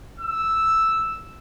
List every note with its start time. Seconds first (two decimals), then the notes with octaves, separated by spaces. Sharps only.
0.20 E6